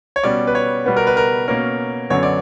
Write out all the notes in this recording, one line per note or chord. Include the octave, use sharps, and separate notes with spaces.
C#5
B2 G3 C#4 D5
B4
C#5
B2 G3 B3 B4
A#4
B4
A#4
B2 A#3 C#4 A#4
F#2 D3 F#3 B3 C#5
D5